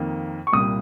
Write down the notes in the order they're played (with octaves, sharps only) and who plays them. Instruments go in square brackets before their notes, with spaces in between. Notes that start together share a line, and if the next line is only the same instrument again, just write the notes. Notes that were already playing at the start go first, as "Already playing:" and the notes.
Already playing: [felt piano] F2 D#3 A#3
[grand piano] C#6
[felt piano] C2 A#2 G3 A#3 [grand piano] D#6